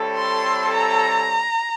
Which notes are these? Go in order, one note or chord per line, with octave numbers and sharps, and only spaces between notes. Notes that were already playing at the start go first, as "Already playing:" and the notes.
Already playing: G3 C4 E4 A4 C#5
C6
A#5